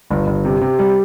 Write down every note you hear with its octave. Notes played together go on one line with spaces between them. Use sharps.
G1
G1
C3
C3
G3